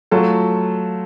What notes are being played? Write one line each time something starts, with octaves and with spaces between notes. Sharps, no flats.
F#3 A3 F4 A4